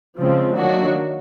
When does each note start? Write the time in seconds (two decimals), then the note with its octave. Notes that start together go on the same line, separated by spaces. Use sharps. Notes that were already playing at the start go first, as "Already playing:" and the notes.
0.19 C#3 F3 G#3 C4
0.57 D#3 F#3 A#3 D4 F#4